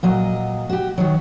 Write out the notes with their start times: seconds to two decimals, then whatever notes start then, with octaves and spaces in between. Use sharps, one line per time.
0.03 A#2 F#3 D#5
0.69 F#4 G4
0.98 D#3 F#3